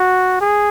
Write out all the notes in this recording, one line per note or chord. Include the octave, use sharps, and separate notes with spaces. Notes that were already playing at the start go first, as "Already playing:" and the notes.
Already playing: F#4
G#4